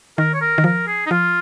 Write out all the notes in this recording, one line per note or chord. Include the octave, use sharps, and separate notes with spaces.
D#3 A#4
C#5
A#4
D#3
F3 A#4
G#4
D#4
F3 F4